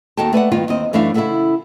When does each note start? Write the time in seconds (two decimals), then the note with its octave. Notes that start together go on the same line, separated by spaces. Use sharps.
0.17 D#2 D#4 F#4 A4 G5 A5
0.33 A3 B4 D5 F#5
0.52 G2 D#3 B3 F4
0.68 D#2 C4 D#5
0.93 F#2 E3 A3 D4 E5 F5
1.14 C#3 E4 F4 A4 E5 F#5